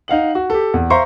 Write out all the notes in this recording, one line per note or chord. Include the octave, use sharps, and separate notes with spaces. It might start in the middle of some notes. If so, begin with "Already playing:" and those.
D#4 F5 F#5 F#7
F#4
G4 A4
E2
C5 E5 F5 A#5 C6 C#6